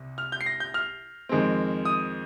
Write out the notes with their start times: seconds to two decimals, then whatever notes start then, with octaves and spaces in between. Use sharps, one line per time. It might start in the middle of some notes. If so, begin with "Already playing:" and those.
Already playing: C2 C3
0.18 F6
0.32 G6
0.41 C7
0.46 A#6
0.60 G6
0.74 F6
1.29 F2 D#3 G#3 C4
1.85 D#6